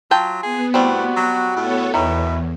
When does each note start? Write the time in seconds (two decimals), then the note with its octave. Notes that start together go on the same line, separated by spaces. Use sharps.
0.11 F#3 F4 G5 A5
0.43 B3 G#4
0.74 A2 G3 C4 F#4
1.16 F#3
1.56 A2 B3 A4 C#5
1.94 E2 B2 D#3 E4